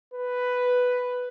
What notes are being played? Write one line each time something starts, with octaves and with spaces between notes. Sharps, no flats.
B4